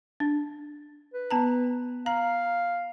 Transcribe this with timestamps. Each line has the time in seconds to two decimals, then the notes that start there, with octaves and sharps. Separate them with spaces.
0.20 D4
1.14 B4
1.31 B3 A5 A#5
2.06 F5 A#5